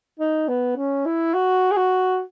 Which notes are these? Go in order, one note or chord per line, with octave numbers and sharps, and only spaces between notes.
D#4
B3
C#4
E4
F#4
G#4
F#4